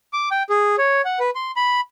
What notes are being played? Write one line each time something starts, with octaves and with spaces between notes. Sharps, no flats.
D6
G5
G#4
C#5
F#5
B4
C6
B5